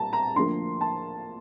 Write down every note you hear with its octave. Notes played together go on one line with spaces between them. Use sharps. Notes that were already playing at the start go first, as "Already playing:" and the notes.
Already playing: C2 A#2 G3 A5 A#5
A#5
D2 D3 F3 A#3 C6
A5